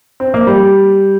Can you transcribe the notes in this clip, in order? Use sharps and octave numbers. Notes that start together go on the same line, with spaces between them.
C4
A#3
G3